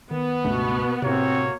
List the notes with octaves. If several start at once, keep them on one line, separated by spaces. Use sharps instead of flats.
D#3 B3
C#2 G2 B2 A3
A2 C3 A#3 C4 F#4 C#5